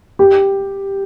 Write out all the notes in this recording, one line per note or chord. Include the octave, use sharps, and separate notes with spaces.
G4